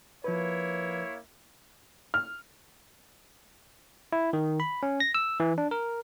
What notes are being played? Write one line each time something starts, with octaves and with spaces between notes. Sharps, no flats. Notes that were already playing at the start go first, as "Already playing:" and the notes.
F3 A#3 E4 B4 C#5
F6
E4
D#3
B5
C#4
A#6
E6
E3
D4
A#4